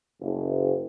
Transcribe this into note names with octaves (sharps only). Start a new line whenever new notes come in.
F#1